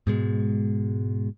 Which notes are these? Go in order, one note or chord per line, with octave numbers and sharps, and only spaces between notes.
G#2 B2 G#3